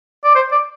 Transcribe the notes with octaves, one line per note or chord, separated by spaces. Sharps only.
D5
C5
D5